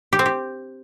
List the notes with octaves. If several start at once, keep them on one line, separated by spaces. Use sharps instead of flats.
G4
C4
G4